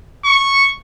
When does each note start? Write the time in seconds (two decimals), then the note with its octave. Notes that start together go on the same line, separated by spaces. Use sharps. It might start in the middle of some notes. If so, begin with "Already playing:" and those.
0.25 C#6